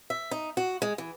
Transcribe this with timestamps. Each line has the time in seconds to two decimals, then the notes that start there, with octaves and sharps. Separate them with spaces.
0.10 E5
0.31 D#4
0.57 F#4
0.82 G#3
0.98 E3